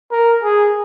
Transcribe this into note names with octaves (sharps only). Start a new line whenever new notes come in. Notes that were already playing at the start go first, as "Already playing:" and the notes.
A#4
G#4